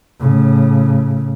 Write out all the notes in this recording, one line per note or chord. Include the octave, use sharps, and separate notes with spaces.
A2 C#3